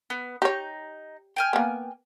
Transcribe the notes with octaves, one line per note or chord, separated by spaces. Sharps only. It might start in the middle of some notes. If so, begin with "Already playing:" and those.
B3
D#4 G4 C#5
G5 G#5 F6
A#3 B3